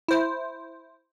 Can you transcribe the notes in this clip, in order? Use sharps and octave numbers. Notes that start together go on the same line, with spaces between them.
E4 C5